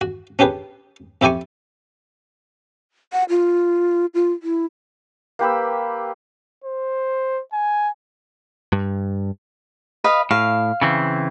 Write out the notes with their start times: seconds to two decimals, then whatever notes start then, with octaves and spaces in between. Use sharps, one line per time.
0.01 F#4
0.39 C#4 D4 G4 G#4 B4
1.21 F2 E4 G4 D5 G#5 C#6
3.13 F#5
3.30 F4
4.14 F4
4.43 E4
5.39 A#3 G4 B4 E6
6.64 C5
7.53 G#5
8.73 G2
10.04 B4 D#5 F5
10.31 A2 F5
10.81 C#3 E3 C4